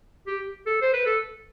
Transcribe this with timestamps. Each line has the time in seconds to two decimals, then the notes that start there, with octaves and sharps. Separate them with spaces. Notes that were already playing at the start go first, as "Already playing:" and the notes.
0.27 G4
0.67 A4
0.82 C5
0.94 B4
1.06 A4